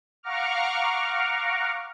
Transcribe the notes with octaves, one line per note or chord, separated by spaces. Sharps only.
F5 F#5 A#5 C#6 D6 F6